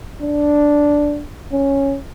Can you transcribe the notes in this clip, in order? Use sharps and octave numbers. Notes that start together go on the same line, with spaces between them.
D4
C#4